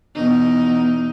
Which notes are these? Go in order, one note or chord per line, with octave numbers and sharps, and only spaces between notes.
E2 B2 D#4